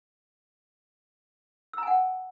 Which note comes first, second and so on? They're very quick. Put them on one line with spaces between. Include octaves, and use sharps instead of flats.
E6 A#5 G#5 F#5